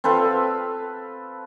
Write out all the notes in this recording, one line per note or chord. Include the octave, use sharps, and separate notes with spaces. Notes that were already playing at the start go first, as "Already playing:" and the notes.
C4 A4 B4 F5